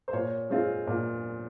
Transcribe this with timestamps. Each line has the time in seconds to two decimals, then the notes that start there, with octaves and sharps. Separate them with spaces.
0.08 C5
0.13 A#2 C#5
0.50 G#3 C4 F4
0.87 A#2